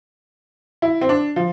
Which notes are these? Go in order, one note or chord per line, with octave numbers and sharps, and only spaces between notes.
E4
C4
D4
F3